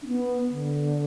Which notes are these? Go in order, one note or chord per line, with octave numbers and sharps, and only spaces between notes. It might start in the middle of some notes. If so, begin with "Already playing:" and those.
D4
B3
D3